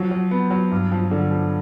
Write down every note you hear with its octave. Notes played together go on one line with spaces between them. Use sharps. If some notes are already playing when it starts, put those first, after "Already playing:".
Already playing: F3 F#3
F#3
B3
F#3
G2
F3
D3
F3